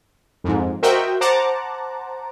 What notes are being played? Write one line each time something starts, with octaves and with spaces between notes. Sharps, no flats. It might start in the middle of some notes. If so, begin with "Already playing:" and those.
F2 G#2
F#4 A#4 C5 D#5 E5 G5
C5 F#5 A5 A#5 D6